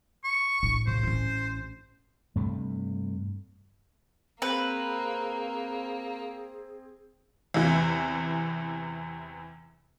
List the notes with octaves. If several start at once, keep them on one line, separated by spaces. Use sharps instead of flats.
C#6
A2 D4
C#3 C5
A1 C#4
G2 C3 A3
A#3 C4 G#4 B4
E2 C3 E3